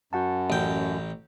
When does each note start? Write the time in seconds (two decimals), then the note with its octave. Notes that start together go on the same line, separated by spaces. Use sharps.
0.13 F#2 F#4 F#5 A5
0.50 A1 G5